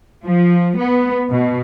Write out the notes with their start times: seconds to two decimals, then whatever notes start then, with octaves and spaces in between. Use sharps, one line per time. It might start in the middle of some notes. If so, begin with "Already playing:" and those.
0.24 F3
0.78 B3
1.31 B2